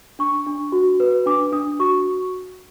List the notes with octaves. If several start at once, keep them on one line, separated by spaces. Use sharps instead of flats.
D4 C#6
D4
F#4
B4
D4 D6
D4 D#6
F#4 C#6